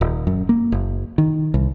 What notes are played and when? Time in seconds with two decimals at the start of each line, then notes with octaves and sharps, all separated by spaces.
0.01 D#1
0.27 F#2
0.49 A#3
0.72 F#1
1.18 D#3
1.54 C2